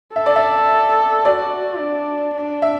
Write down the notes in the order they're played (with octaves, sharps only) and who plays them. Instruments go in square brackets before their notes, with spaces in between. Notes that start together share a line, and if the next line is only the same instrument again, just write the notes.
[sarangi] A4 [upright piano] E5
[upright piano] D5
E5
[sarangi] F#4 [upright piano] D5
[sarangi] D4
D4
[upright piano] E5